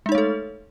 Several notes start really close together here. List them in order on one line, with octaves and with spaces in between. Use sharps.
G#3 D#4 C#5 A3 A4